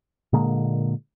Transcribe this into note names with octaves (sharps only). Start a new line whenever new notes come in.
A#2 D3 G#3 A#3